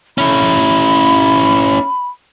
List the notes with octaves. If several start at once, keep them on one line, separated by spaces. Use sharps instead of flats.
C#4 E4 B5